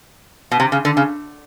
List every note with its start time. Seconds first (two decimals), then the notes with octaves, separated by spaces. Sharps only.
0.52 B2
0.60 C3
0.72 C#3
0.85 D3
0.97 C#3